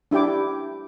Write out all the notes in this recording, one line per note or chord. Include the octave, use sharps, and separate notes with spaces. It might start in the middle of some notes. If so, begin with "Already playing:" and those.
D4 E4 G4 G5 D6